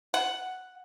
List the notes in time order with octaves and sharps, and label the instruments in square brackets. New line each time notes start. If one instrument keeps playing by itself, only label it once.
[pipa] F#5